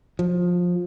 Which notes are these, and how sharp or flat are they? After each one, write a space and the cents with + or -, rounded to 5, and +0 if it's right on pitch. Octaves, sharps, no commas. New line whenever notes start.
F3 +20